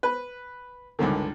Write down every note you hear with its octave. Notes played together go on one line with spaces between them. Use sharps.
B4
C#2 G2 D3 D#3